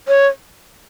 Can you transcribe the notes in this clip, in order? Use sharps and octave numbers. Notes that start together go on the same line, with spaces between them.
C#5